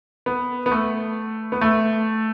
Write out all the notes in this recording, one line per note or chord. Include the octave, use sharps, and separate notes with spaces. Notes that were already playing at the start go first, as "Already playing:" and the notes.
B3
B3
A3
B3
A3